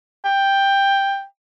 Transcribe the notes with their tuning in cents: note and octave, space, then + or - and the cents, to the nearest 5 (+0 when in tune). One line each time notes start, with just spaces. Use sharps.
G5 +10